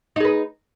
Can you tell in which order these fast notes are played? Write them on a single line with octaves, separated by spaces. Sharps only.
D#4 G#4 B4